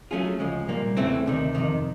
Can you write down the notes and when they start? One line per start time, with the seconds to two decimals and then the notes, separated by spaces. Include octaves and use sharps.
0.11 F#3 A3 C#4 F4 G#4
0.39 D2 C#3 F3 G#3
0.68 C2 A#2 G3 A#3
0.97 E2 C#3 E3 A3 C4
1.26 D2 C3 D#3
1.55 F2 C3 D#3